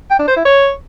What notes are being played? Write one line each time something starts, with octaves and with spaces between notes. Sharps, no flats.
G5
D4
C5
E4
C#5